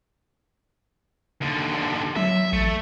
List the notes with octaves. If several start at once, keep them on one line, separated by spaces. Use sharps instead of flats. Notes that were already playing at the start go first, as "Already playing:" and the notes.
D#2 D3
F#3 E5
A1 A3